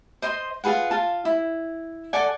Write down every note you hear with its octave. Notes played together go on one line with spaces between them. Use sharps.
C5 D#5 C6
F4 G#4 B4 F#5
F4 F5 A5
E4
A4 D5 F#5 G#5